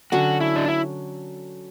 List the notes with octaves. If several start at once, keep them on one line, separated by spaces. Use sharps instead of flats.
D3 F#3 C#4 F#4
E4
D4
E4